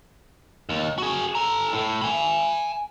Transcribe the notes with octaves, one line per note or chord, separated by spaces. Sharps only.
D#2
F#4 G#4
A4 A#5
A2
G#5 B5